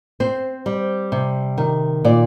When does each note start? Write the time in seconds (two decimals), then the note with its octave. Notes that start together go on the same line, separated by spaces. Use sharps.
0.20 C4 C5
0.66 G3
1.12 C3
1.58 D#3
2.04 A#2 D5